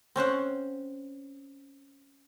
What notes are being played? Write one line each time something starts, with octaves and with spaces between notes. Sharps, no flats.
C4 C#4 C5 F#5